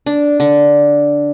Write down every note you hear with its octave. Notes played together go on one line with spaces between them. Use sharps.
D4
D3